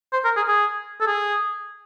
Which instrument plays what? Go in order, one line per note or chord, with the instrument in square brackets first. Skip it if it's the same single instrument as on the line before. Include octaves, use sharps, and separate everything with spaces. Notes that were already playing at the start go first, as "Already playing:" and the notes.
[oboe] C5
A#4
G#4
G#4
A4
G#4